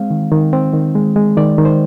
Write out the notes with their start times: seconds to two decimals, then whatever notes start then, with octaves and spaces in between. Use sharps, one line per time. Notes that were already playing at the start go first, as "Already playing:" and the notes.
Already playing: G#3 C4 F5
0.10 D#3
0.32 D#3
0.53 C4
0.74 D#3
0.95 G#3
1.16 G#3
1.37 D#3 D5
1.58 D#3
1.65 C5